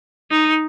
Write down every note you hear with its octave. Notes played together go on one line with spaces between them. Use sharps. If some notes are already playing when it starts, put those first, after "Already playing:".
D#4